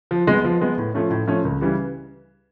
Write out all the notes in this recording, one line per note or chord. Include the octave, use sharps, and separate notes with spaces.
F3
G#3 B3
F3
G#3 B3
A2
F3 A3 C#4
A2
F3 A3 C#4
C#2
C#3 E3 G3